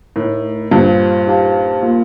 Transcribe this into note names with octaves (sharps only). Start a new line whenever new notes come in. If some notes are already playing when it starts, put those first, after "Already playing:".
A2 A3 D#4 A#4
G2 A#2 G4 C5 F5 A5
D#4 G4 C5 F5 A5
A#3 F4 A#4